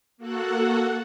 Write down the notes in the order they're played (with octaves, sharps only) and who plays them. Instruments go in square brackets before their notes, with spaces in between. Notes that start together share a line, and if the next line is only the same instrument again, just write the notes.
[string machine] A#3 F#4 A4 F#5